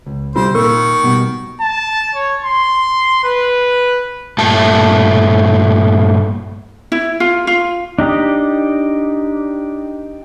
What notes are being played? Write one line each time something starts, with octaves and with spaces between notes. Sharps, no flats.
C#2
C3 G3 C4 F4 C5
A#2 D#3 A#4 C#6
B2 G3
A5
C#5
C6
B4
G2 A#2 A3 A5
E4
F4
F4
D4 D#4 G4 D#5